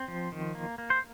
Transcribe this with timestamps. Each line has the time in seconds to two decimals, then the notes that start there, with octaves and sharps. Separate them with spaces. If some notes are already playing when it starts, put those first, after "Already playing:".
Already playing: C4
0.08 F3
0.32 D#3
0.55 A#3
0.78 A#3
0.90 C5